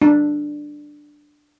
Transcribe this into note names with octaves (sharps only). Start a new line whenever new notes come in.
D4